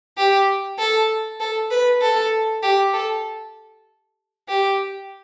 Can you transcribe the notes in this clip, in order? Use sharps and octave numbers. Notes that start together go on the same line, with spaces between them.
G4
A4
A4
B4
A4
G4
A4
G4